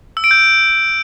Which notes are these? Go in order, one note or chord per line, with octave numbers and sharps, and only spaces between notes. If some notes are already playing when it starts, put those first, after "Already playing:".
E6
D7
G6